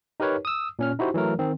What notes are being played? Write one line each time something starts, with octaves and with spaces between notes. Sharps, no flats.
D#4 G4 A#4 B4 C#5
D#6 E6
A#2 C#4 F6
D#4 E4 F#4 G4 C5
E3 F#3 A3 A#4
D#3 C4